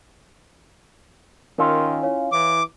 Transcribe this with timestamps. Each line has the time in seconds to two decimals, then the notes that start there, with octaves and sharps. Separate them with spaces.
1.58 D#3 C#4 F4 A#4 E6
2.03 E4 C#5 F5
2.32 E3 D6